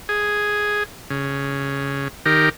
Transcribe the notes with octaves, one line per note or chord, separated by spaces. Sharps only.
G#4
C#3
D#3 G4 A#4